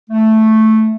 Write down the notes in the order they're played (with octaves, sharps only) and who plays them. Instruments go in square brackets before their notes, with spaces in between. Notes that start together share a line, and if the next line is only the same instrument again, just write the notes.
[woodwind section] A3